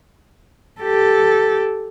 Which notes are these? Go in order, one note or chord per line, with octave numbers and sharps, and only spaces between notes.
G4 A4